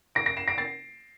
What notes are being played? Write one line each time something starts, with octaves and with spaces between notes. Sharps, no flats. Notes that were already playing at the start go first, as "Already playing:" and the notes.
A#6 D7
A#6 D7
C7 E7
A#6 D7
A6 C7